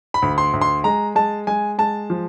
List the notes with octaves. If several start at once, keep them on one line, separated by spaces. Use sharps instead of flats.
B5
D2
C6
D2
C6
G#3 A#5
G#3 A5
G#3 G#5
G#3 A5
F3